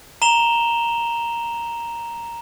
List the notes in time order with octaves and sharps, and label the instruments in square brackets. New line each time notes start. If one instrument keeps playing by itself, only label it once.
[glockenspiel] A#5 E7 F7 G7